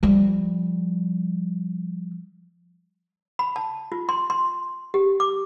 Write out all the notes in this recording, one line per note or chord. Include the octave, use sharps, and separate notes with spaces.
F3 G3
B5
A5
F4
C6
C6
G4
D6